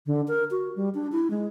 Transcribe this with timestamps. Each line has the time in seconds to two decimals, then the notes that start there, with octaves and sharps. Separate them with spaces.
0.06 D3
0.28 A#4
0.51 F#4
0.76 G3
0.94 D4
1.12 E4
1.30 G#3